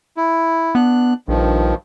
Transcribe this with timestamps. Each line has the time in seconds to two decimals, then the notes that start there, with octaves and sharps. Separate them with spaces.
0.17 E4
0.75 B3 D4 F#6
1.28 A#1 G2 D#3 F3